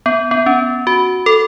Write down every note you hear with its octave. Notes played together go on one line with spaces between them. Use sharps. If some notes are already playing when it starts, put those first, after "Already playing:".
B3
B3
C#4
F#4
A4